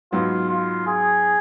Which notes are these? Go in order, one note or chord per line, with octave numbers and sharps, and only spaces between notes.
G#2 F#3 B3 F4
F4
G#4